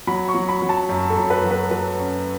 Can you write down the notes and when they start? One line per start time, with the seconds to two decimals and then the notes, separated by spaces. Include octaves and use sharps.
0.07 F#3 B5
0.28 C#6
0.34 F#3
0.49 B5
0.62 F#3
0.69 A5
0.89 F#2
1.10 A4
1.17 F#2
1.30 B4
1.44 F#3
1.51 B4
1.71 F#3 B4
1.99 C#4